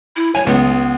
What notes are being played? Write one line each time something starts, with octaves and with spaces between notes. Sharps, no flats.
E4
C#5 G#5
C#2 B3